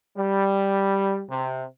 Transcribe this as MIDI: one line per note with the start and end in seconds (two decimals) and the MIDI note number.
0.16 1.23 55
1.30 1.62 48